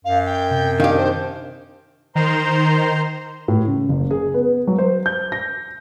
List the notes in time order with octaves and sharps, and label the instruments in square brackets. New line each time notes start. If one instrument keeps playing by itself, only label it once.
[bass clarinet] F#2 [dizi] F5
[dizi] G5
[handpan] C3
[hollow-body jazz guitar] D#3 G4 [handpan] D4 [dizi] F5
[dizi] C5
[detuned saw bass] D#3 [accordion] C5 A#5 C6
[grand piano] A2
C#3
F#1
G#4
B3
F#3
C5
G6
A#6